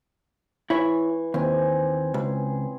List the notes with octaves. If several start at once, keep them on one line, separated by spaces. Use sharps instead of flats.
E3 E4 C#5 C#6
D#2 C4 G#5
C#2 G#4